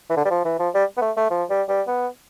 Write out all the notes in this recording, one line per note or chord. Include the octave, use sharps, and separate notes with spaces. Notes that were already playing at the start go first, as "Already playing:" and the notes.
E3
D3
G3
F3
E3
F3
G3
B3
A3
A3
F3
G3
G3
B3